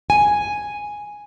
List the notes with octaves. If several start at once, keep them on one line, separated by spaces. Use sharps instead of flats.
G#5